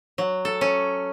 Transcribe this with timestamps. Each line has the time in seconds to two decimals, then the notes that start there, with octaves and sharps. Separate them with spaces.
0.18 F#3
0.45 A4
0.61 C#4